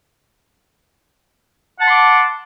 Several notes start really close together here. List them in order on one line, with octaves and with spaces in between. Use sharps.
F#5 A5 C6 D6